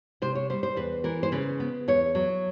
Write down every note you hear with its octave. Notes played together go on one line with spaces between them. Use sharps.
C3 C5
C#5
G3 C5
C5
E2 B4
E3 A#4
C5
C#3 B4
B3
E2 C#5
F#3